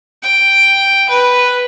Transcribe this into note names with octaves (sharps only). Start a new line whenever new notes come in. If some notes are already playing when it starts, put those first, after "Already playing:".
G5
B4